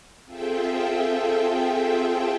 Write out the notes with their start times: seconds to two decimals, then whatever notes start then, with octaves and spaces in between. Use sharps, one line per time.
0.24 C4 F4 G#4 A4 E5 G5